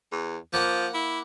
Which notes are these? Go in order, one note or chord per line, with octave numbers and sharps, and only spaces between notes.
E2
F3 A#3 F#5
E4